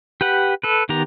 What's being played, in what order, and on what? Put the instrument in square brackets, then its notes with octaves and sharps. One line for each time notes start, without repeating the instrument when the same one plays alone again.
[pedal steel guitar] G4 B4 F#5
A4 B4
D#3 B3 G4 A#5